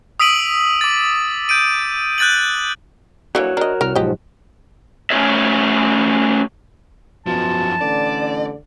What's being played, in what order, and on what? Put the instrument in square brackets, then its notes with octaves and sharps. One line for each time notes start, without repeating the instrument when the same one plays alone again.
[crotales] D#6 E6 B6 D7 D#7 F#7
D6 A6
G6 D7 D#7
F#6 G6 A6 D7 F#7
[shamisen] D3 E3 A#3 [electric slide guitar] F#4 C#5
[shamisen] D4 D#5 [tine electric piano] A#4
[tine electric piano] C2 F6 [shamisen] A#4
[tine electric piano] B1 G#2 F3 [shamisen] G4 D#5
[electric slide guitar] A3 C#4 F#4 G#4 C#5 E5
[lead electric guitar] F#2 F3 [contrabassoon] B2 [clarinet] A5
[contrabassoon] A1 [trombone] D3 [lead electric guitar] D5